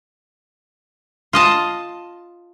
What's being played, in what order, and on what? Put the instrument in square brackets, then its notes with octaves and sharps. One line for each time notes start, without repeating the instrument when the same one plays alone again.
[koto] F4 D#5 A5